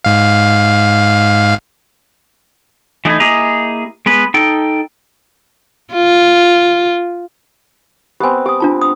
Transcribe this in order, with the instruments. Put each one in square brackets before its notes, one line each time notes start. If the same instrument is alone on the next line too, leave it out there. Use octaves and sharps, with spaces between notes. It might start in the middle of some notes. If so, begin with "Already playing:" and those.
[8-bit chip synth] G#2 F5
[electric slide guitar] E3 A3 D#4 E4
A#3 E4 G4 G#4 D#5 A#5
G#3 B3 B4
D#4 A4 G5
[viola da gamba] F4
[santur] B3 C4 [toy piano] G4 G#5
[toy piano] G4 D#6 [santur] D6
[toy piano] D4 F4 A5
D#6